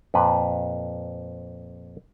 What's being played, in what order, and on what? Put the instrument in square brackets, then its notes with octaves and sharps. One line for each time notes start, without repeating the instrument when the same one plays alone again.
[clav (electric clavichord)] F2 A#2 B4